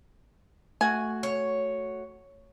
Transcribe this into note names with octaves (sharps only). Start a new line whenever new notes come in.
A3 F#4 G#5
C#5